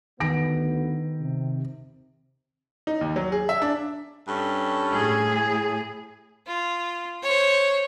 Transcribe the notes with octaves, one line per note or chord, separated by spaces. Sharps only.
D2 D#3 B3 A#6 D7
C3
D#4
D#2
F#3
G#4
E5
D4
G2 C#4 A4
A2 G#4
F4
C5 C#5